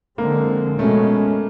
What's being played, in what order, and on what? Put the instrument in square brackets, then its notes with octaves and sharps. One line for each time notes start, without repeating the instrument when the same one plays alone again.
[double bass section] D3 F3 G#3 C4 [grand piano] A#3
[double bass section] B2 G#3 C#4 [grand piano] A3